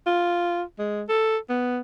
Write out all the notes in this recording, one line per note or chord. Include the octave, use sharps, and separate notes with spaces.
F4
G#3
A4
B3